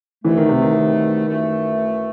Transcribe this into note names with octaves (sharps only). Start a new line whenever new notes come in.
C2 B2 E3 A3
D#3
C3
D#3
F#2 E3 A3